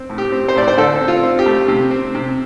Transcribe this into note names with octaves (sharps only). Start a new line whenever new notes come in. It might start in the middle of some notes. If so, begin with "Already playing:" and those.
Already playing: C4
A2
G4
C4
C5
A2 D5
C5
D3 A4
C4
F4
C4
G4
A3
C3
C4
C3